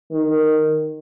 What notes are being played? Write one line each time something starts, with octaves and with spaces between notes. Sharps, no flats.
D#3